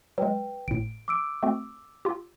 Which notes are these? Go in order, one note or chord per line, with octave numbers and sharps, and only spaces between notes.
F#3 G#3 B4 G5
G#1 A2 D7
D6 E6 D7
A3 C4 F#4
F4 G4